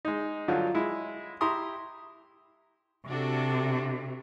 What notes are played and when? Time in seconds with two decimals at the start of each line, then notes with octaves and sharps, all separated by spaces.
0.05 G#3 D#4
0.48 G2 D3 F3 F#3 F4
0.75 G#3 E4
1.41 E4 G4 A#5 C6 D#6
3.07 C3 D4 F#4 A4